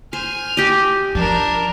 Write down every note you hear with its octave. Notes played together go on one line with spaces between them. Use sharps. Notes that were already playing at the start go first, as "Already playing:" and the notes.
C5 G#5 F6
G4 D#5
F3 D4 A#4